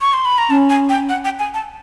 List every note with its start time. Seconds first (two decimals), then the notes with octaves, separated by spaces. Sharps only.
0.01 C#6
0.13 C6
0.25 B5
0.38 A#5
0.49 C#4 A5
0.70 G#5
0.89 G5
1.09 F#5
1.25 G5
1.39 G#5
1.54 A5